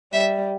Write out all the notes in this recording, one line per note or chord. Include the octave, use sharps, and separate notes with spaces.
G3 E5